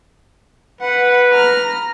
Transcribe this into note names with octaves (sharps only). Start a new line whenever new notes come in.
B4 F#5
A#5 F6